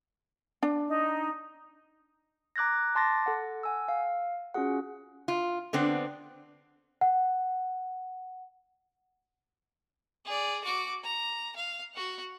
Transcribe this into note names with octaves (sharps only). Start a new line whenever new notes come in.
D4
D#4
A#5 D6 F#6 G#6 A#6
A5 C6 D6 A6 A#6
A4 F#5
F#5 G#5 E6
F5
C#4 F4 F#4 G#4 F#5
F4
D3 B3 C4 D4
F#5
G#4 D5
F#4 D6
A#5
F5
F#4 F#5